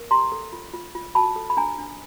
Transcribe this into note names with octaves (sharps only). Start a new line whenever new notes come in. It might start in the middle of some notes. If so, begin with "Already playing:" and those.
Already playing: A#4
G4 A#5 C6
A4
F4
F4
F4
F#4 A5 B5
A4
B5
D4 G#5 A#5
D4